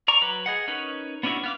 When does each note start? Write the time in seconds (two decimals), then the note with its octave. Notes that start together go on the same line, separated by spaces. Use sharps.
0.08 D5 A#5 C#6
0.22 F#3 B4
0.46 G#4 D#5 F#5
0.68 C#4 D#4 A#4 B4 C#5
1.23 B3 C#4 D4 E4 F#4
1.44 B3 F5 D6